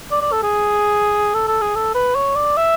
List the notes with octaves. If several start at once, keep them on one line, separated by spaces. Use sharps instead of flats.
D5
D5
A4
G#4
A4
A4
G#4
A4
B4
C#5
D5
E5